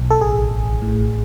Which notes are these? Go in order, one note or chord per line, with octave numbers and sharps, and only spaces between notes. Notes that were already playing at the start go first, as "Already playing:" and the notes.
Already playing: B1
A4
A1 G#4
A1
A2